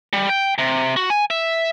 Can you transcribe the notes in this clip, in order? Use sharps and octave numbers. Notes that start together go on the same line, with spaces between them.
G3
G5
C3
F#4
G#5
E5